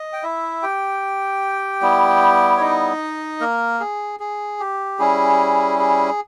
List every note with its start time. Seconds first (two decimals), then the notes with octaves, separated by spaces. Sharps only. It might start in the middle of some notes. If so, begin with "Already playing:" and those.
Already playing: D#5
0.13 G5
0.23 E4 E5
0.63 G4 G5
1.81 G3 B3 E4
2.57 C#5
2.61 D#4 D#5
3.40 A#3 A#4
3.80 G#4
4.20 G#4
4.60 G4
4.99 G3 C#4 E4 G#4
5.79 G#4